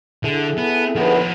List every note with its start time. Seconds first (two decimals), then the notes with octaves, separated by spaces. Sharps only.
0.24 D3 E4 G#4 A4
0.58 B3
0.95 D#2 D3 F3 B3 F#4